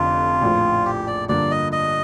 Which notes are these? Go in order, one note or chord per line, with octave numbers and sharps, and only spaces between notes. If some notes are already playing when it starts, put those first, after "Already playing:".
Already playing: F1 F2 D3 F3 F4
A#1 A2 F3
G4
D5
G2 D3 F3 A#3 D5
D#5
D#5